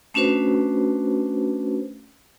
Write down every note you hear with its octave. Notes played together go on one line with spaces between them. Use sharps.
A3 C#4 D4 F#4 B4 C5